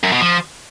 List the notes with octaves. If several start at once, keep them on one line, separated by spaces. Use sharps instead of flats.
F#2
B2
F3